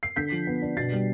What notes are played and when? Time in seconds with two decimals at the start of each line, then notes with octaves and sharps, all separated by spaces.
0.03 C7
0.16 D3 G6 B6
0.32 F3
0.47 B3
0.62 D4
0.77 B2 A6 C7
0.92 G3